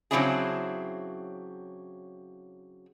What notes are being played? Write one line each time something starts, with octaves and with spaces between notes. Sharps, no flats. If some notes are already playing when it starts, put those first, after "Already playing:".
C#3 F#3 C4 D4 E4 G#4